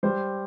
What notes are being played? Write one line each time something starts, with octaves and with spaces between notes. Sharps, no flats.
G3 C5